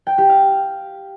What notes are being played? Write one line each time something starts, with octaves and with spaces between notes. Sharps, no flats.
G5
G4
F5